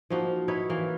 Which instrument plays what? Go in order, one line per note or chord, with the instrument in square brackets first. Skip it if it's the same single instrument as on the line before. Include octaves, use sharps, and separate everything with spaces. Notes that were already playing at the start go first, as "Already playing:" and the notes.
[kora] F3 A#3 D#4 F#4
D#4 E4 B4 C#5
E3 A#3